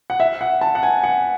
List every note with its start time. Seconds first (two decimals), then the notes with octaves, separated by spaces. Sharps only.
0.10 F#5
0.20 E5
0.41 F#5
0.61 A5
0.75 F#5
0.83 G#5
1.04 F#5